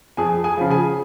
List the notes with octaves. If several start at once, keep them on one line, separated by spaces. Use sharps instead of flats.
F2 G#4 G#5
G#4 G#5
C#3 F3
G#4 G#5